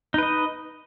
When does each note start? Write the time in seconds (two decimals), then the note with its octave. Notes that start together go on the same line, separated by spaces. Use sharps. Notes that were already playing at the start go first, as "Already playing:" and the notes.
0.14 D#4
0.18 B4
0.23 D#5